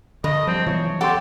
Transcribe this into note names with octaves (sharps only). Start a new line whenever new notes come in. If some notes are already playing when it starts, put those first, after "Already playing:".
G2 D3 D#5
F3 G3 C4
E3 F#3 B3 C#5
G4 A4 F#5 G5 C6